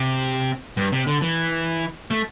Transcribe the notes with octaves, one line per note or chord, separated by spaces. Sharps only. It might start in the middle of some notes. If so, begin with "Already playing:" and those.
Already playing: C3
G2
C3
D3
E3
A3